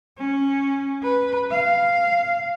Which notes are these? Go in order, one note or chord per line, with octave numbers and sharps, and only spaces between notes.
C#4
B4
F5